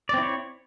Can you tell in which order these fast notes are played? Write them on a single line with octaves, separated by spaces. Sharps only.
D5 C4 E4 C#5